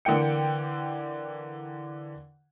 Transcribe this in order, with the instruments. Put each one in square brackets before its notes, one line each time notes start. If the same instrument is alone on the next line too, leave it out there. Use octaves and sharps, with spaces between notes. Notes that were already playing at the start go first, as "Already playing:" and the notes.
[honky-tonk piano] D3 E3 A#3 G5 C#7